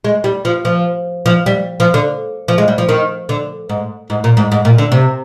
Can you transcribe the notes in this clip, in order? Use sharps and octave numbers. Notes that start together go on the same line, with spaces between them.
G#3
G3
F3
F3
F3
G3
F3
D3
F3
G#3
G3
F3
D#3
D3
G#2
G#2
A#2
G#2
G#2
A#2
D3
C3